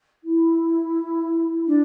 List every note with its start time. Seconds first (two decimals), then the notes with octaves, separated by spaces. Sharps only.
0.24 E4
1.66 D4